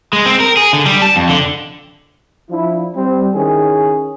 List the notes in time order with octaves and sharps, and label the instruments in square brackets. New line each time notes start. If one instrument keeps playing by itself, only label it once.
[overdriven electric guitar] G#3
C4
A#4
G#4
D3
G3
A5
F2
D3
[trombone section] F3 D4 E4
G3 C4
D#3 C#4 E4 G#4